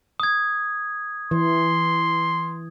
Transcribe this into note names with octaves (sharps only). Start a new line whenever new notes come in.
D#6 G#6
E3 C6